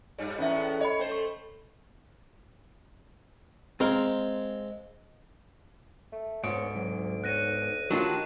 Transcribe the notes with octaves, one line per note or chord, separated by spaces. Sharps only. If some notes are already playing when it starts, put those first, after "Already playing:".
G2 G3
E2 A2 B3 C#4 E5
C#5 D#5 B5
A3 C5 G5
C#6
G#3 C4 A#4 F5
A3
D2 G#2 B3 C#5 D7
C3 F#3
B3 C#5 F#6 A#6 D#7
D#3 F#3 D4 F4 G4 A5 E7